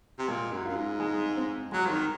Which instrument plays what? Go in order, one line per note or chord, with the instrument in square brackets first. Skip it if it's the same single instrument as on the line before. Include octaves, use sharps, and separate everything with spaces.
[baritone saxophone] C3
[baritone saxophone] A#2 [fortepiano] G#3
[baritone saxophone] F#2
[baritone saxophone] F#2 [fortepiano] F4
[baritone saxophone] G#2
[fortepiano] G#3
C4
[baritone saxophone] F#3 [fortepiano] G#3
[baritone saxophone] F3
D#3